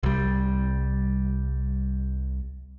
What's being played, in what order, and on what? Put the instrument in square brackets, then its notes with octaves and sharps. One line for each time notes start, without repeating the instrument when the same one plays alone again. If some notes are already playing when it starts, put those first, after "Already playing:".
[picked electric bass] C2 G3